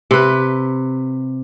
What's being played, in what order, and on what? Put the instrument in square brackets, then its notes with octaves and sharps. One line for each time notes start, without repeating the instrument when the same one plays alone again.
[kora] C3 B4